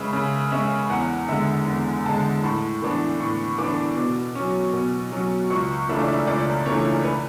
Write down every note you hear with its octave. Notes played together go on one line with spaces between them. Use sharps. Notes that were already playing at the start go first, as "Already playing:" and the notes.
Already playing: C#3 G#3 C#4 B4 E5
C#3
G#3 C#4 E5
E2 F#5
D3 G#3 E5
E2
D3 G#3 A5
A2 B5
E3 B3 D4
A2 C#6
E3 B3 D4 D6
B2
F#3 C#4
B2
F#3 C#4
C#2 C#6
C#3 E3 A3 D4 E5
D5
E5
C#2 D5
C#3 E3 A3 D4 C#5
B4